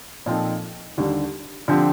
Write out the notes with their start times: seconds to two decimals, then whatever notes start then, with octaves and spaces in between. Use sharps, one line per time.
0.26 A#2 F3 C4 D#4 A4
0.97 D#2 D3 G3 D4
1.68 D3 F3 C4 G4